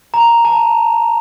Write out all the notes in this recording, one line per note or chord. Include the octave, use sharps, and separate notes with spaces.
A#5
A5